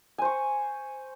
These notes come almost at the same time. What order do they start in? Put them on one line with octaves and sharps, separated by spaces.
G#5 C5 C#6